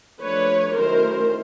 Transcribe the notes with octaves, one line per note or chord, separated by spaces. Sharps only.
F3 A3 D4 B4 C#5
D#3 F#3 A3 C#4 E4 A#4 C5